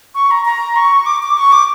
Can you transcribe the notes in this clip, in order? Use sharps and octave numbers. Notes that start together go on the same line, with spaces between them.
C#6
A#5
A#5
C#6
D6
D6
C#6
D6